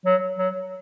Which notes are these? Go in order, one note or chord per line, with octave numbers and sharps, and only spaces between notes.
F#3
F#3